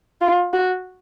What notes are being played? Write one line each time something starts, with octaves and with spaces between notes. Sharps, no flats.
F4
F#4